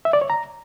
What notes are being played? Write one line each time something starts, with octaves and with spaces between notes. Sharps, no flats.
E5
D5
C#5
A#5